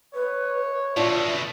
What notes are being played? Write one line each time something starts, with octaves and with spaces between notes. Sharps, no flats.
B4 C#5
B2 A3 D4 F4 E5